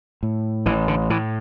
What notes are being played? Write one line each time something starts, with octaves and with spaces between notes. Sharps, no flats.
A2
A1 E3
D3
A2 E3